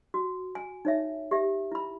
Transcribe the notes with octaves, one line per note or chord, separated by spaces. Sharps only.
F#4
G#5
D#4 C#5 E5
G4 E5
E4 B5